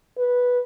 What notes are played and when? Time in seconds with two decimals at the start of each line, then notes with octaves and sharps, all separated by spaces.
0.18 B4